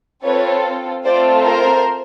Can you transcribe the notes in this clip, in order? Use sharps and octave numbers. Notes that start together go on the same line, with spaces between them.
C4 F4 A4 B4 C#5
A3 C4 F4 A4 C5 D5
A#4 C5